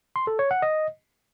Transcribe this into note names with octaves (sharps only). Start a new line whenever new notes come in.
C6
A4
C#5
F#5
D#5